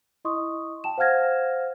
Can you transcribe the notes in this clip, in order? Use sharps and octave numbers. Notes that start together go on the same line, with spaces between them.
E4 D#5 C6 C#6 D#6
G5 A5 E7
C5 F5 F#5 F6 G#6 A#6